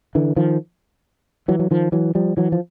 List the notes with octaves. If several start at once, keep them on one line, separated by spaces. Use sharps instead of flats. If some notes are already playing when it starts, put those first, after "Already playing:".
D3 E3
D#3 F3
E3 F#3
F#3
D#3 F3
E3 F#3
F3 G3
E3 F#3
F3